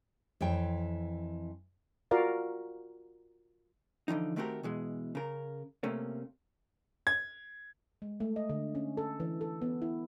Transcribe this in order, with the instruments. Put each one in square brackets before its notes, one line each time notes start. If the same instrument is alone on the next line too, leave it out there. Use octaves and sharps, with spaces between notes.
[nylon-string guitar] F2 E3 C#5 G5
[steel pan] F4 F#4 A#4 D5 F5
[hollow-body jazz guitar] D3 E3 F3 D#4
D#3 A3 C4 F#4 G4 A#4
B2 E3 G#3
C#3 A#4
C3 A3 A#3 C#4
[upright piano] G#6
[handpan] G#3
A3
D#5
D3
C#4
A4
E3
A4
B3
E4